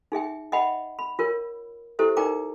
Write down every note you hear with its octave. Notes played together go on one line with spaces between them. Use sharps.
D#4 G#4 E5 G5
D#5 E5 F#5 G5 B5
B5
F4 A#4 C#5
E4 G4 A4 C5 E5
D#4 A#4 D5 G5 A#5 D6